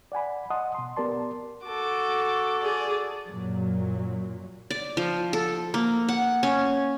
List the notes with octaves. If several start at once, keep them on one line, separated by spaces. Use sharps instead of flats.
D5 F#5 G#5 B5
D#5 F#5 A5 C6 D#6
B2 C6
B3 G4 A#4 D5 A5 C6
F#4 A4 D6
G#4 D5
F#2 A#2 F#3
D5
F3
A4
A#3
F#5
C#4